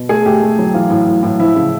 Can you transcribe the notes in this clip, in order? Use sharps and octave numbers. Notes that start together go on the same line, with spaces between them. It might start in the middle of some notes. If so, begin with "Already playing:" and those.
Already playing: B2
A3 G#4
A3 G4
A3
F#3
E3 F4
A2
A2
A2
F3 E4
C#3